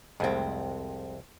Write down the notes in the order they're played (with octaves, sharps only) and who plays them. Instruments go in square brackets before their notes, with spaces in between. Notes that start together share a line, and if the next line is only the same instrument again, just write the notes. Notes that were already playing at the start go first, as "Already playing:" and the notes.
[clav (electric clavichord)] C2 F2 [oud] G#3 C4